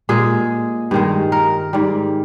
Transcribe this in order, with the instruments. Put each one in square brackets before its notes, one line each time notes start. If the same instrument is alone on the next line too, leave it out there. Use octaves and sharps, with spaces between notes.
[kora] A#2 G#3 G#4
G2 D#3 G#3
A#4
G#2 G3